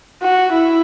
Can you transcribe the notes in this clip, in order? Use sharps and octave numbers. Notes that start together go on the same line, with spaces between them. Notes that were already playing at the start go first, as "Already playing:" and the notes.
F#4
E4